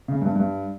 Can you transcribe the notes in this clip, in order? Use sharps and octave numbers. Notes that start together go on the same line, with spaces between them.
C#3
G2
G2